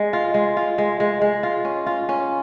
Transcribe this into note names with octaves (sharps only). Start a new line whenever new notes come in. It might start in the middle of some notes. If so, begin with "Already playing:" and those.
Already playing: G#3
F4
G#3
F4
G#3
G#3
G#3
F4
C#4
F4
C#4